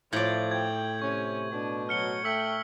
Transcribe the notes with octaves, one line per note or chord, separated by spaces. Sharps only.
A2 F3 F4 D5 G6 G#6 F#7
G5 G#6
C3 C#4 C#6
B2 D4
F#3 F6 C#7 G7
A3 G5 E6 B6 F#7